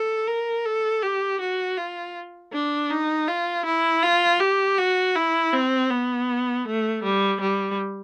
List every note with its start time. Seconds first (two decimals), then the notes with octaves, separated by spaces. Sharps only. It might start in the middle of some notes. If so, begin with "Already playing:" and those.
Already playing: A4
0.27 A#4
0.66 A4
1.03 G4
1.41 F#4
1.77 F4
2.53 D4
2.90 D#4
3.28 F4
3.65 E4
4.03 F4
4.40 G4
4.78 F#4
5.16 E4
5.54 C4
5.91 B3
6.66 A3
7.03 G3
7.41 G3